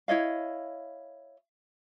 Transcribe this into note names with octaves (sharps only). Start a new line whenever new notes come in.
E4 C#5 D#5 F5